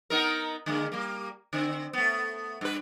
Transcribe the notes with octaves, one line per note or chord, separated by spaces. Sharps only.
B3 D#4 A#4
D3 G#3 A#3
G3 A#3
D3 C4
A3 B3
G2 B4